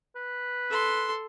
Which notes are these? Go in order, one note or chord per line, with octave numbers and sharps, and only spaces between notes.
B4
A4 C6